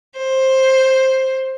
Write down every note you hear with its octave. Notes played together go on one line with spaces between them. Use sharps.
C5